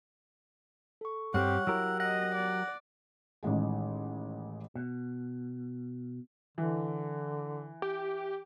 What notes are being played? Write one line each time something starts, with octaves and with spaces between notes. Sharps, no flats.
A4 C#6
G2 G3 C4 G4 C#5 F#5 C#6 F6
F#3 E4 G4 A#4 E6
D#5 F#5 A#6
D5
A1 D#3 G#3 G#4
B2
D3 E3
G4